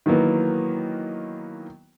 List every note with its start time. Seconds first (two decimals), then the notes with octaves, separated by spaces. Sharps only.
0.06 D#3 E3 F#3 A#3 B3